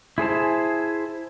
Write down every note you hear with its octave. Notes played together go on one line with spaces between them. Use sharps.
E4 G#4 C5 A5